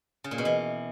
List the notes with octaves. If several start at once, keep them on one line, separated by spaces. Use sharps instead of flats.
C#3
A#2
B2
E3